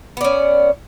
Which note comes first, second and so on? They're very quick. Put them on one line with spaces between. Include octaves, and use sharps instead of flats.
B3 D5 C#4